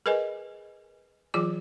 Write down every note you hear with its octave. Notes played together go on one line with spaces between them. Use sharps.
G#4 A#4 B4 D#5 G#5
E3 F#3 F4 G#4 D6